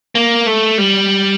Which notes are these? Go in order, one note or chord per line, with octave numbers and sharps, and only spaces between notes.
A#3
A3
G3